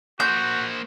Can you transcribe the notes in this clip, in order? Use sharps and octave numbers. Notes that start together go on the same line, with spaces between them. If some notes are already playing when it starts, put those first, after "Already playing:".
A#3 F#4 C5 G6